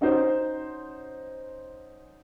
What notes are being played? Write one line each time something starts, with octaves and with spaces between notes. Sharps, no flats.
C#4 D#4 F#4 C5